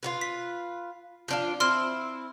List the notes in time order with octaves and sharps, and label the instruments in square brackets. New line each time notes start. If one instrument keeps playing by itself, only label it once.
[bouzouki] F4 F#4 B4
[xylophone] B6
[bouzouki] F3 D4 F4
[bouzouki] C4 E4 [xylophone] C6 F6